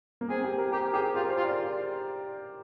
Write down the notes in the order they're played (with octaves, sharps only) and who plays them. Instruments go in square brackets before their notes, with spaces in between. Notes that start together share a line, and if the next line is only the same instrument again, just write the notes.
[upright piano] A#3
[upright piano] C4 [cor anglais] G#4
[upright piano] G4
A#4
[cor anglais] G4 [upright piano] A#4
[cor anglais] G4 [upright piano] G#4
[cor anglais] F4 [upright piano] G4
[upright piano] A#4
C5
[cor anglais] F4
[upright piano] D5